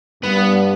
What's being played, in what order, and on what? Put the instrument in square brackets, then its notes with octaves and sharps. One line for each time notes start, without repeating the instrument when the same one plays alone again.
[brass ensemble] G2 [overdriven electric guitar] B3